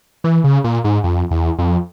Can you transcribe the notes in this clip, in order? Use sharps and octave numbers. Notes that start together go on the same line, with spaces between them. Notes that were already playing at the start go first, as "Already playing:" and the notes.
E3
C#3
A#2
G#2
F2
E2
F2